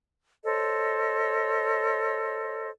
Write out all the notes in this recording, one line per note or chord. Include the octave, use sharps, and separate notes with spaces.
A4 C5 C#5 D#5